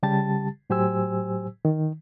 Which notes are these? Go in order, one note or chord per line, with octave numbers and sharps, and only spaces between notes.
C#3 G3 G4 A5 A6
A2 F#3 G4 C5 G#5 E6
D#3